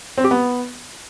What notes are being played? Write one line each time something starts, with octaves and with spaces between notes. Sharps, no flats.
C4
G4
B3